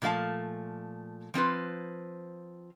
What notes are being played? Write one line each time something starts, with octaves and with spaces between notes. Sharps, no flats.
A#2 F3 A3 F5 A5
F3 C4 F4 B4